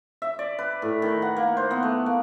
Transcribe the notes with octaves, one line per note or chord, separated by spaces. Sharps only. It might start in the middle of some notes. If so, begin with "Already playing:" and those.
E5
D5
B4
A2
D#3
F#5
A#3
C5
B3
A3
A#3